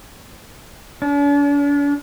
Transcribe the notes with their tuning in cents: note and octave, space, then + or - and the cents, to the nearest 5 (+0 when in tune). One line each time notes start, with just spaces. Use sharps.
D4 -45